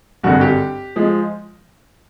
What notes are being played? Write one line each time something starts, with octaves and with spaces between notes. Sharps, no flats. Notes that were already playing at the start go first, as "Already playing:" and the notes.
G#1 G2 D3 F#4
G4
F3 G#3